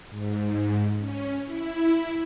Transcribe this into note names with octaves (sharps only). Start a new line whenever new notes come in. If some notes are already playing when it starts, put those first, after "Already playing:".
G#2
C#4
E4